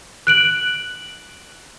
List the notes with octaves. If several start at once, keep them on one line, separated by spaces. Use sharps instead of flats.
F#6 D7 F#7